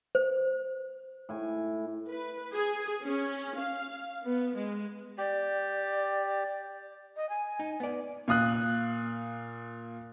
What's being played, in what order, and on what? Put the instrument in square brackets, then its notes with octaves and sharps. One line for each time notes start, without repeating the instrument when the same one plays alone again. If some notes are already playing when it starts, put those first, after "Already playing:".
[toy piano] C5
[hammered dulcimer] A2 G#5
[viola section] B4
G#4
C#4
F5
B3
G#3
[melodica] G4 [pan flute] D5
[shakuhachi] D#5
G#5
[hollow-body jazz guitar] D#4
B3 D5
[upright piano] A#2 F5 D#6 F#6